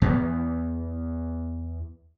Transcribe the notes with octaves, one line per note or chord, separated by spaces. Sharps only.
E2 B3